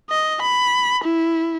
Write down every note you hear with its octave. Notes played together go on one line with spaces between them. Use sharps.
D#5
B5
E4